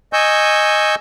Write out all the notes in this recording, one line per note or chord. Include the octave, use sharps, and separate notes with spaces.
D#5 G#5 C#6 E6 G6